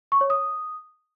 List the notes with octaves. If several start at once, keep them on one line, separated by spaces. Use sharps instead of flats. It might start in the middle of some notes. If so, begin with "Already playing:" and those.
C#6
C#5
D#6